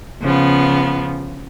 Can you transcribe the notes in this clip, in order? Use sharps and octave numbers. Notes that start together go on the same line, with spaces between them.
C#3 F3 B3